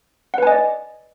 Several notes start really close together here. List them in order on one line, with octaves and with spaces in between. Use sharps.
F#5 B4 G#5 D#5 D5